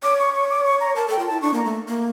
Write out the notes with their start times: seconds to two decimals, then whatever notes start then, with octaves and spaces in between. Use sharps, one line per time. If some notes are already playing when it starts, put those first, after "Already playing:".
0.03 C#5 D6
0.19 C#6
0.34 C#6
0.50 D6
0.65 C#6
0.80 A#5
0.96 A#4 A5
1.08 A4 G5
1.19 F4
1.27 E4 A5
1.42 D4 C#6
1.54 A#3 A#5
1.65 A3
1.88 A#3